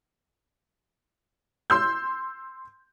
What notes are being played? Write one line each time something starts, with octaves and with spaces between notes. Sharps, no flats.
C6 E6 G6